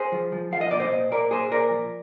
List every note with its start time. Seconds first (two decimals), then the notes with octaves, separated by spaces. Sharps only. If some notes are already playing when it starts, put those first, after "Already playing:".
Already playing: G#4 C5
0.12 F3
0.32 F3
0.52 F3 F5
0.61 D#5
0.71 A#2 D5
0.80 C5 D#5
0.92 A#2
1.11 A#2 A#4 D5
1.31 A#2 G#4 C5
1.51 A#2 A#4 D5
1.71 F3